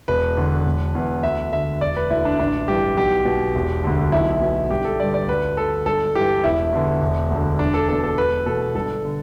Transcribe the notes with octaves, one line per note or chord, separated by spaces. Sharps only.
E1 B4
E2 D3
E1
E2 E3
D2 E5
D3 E5
E1 D5
B4
D2 D3 E4
D4
A1 D4
G2 E3 G4
B1 G4
B2
E1
D2 D3
B1 E4
B2
G1 G4
A4
G2 D3 D5
D5
D2 B4
D3 A4
G1 A4
G2 E3 G4
E1 E4
E2 D3
E1
D2 D3
E1 D4
A4
E2 B2 A4
A4
E1 B4
E2 B2 A4
G1 A4
D3